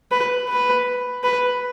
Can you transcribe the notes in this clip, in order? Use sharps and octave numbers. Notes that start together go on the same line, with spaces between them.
B4
B4
B4